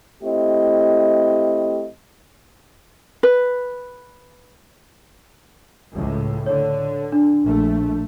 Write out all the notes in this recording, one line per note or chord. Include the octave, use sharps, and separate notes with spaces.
A3 C4 E4 G4 D#5
B4
C#2 A2
D3 C#5
D4
A#1 A3